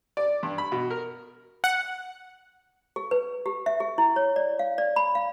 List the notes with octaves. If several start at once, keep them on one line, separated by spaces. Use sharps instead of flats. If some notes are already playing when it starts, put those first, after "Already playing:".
D5
G2
B5
B2
A#4
F#5
G#4
B4
G4
E5
G#4
E4
C#5
D5
F5
D5
B5
F5